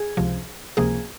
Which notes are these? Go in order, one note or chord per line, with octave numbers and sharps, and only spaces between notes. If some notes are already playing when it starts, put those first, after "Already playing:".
Already playing: G#4
C#2 C3 F3
C#2 C3 F3 A#3 G#4